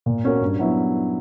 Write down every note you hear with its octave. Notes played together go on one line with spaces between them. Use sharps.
A#2
A#3 C#4 F#4 A#4
G2
F#3 B3 E4